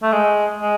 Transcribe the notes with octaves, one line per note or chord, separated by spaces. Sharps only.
A3
G#3
G#3